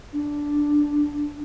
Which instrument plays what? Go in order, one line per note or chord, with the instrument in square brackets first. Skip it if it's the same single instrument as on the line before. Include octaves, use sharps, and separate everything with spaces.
[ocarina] D4